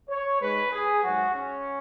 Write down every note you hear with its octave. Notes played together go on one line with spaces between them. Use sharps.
C#5
G#2 G#3 B4
G#4
G#2 F#3 F#4
C#4